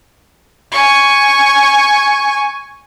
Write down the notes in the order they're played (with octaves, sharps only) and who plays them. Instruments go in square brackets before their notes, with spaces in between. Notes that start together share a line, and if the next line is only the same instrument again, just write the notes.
[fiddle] G#5 C#6